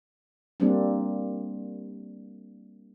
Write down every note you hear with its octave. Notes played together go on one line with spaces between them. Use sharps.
G3 A#3 C4 D4